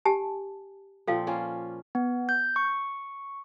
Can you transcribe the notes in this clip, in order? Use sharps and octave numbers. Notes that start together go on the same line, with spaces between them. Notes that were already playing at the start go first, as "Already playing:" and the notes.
G4 G#5 A5
A#2 F3 C4 A4 F5
A#3 C#4 F4
B3
G6
C#6